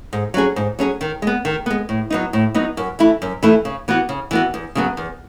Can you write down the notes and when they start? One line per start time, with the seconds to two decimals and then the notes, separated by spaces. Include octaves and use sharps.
0.13 G#2
0.34 F#3 C#4 G#4
0.56 G#2
0.79 F#3 C#4 G#4
1.01 D#3
1.22 G#3 B3
1.45 D#3
1.66 G#3 B3
1.89 A2
2.10 F#3 B3 D#4
2.33 A2
2.54 F#3 B3 D#4
2.77 F#2
2.99 E3 A3 E4
3.22 F#2
3.43 E3 A3 E4
3.65 C#3
3.88 E3 B3 F#4
4.09 C#3
4.31 E3 B3 F#4
4.54 E2
4.75 C#3 F#3 B3
4.97 E2